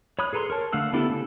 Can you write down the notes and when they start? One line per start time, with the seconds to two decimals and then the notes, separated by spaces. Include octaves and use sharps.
0.19 C#5 B5 D#6 F#6
0.33 G#4 A4 B4 A#5 C6
0.50 A#4 C#5 A5
0.73 D3 A3 F5 F#5 E6
0.93 B3 D4 E4 G4 A4
1.10 C#3 A4